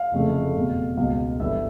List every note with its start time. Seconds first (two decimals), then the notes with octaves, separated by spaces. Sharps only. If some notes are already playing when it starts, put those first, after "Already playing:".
Already playing: F5
0.12 F1 F2 C#3 E3 A3
0.55 F1 E2 B2
0.97 C#2 B2 G#3 F5
1.40 G1 G2 E3 E5